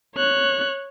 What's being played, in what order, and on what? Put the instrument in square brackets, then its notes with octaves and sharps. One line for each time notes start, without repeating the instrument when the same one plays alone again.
[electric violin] C#5 F#6